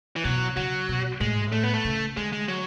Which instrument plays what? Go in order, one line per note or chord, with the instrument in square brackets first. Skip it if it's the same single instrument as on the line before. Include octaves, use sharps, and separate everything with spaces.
[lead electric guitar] E3
[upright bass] B2 [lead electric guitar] F#3
[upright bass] C#3 [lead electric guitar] F#3
[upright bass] B2
[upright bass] A2 [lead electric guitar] G#3
[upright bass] G#2
A2
[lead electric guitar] A3
B3
A3
[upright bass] C#3
[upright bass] D3 [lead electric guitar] G#3
[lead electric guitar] G#3
F#3